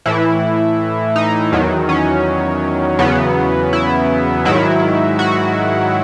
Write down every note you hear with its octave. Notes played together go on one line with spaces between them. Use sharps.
A2 E3 E4
D#4
E2 D#3 F#3
C#4
E2 C#3 F#3 B3
E4
G#2 D#3 F#3 E4
F#4